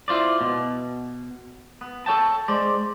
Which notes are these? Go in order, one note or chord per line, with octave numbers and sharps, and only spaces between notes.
E4 F4 C5 D5
B2
B3
A4 C#5 G5 A5
G#3 C5 D5